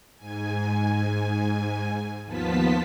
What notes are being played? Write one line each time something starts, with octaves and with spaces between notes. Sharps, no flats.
G#2 G#5
D#2 F3 B3 F4 A5 B6